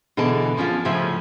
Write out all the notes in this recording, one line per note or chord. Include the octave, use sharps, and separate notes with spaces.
B2 D3 E3 G#4 D5 A5
F3 C#4 D4 F4
A2 C#3 F3 C#4 E5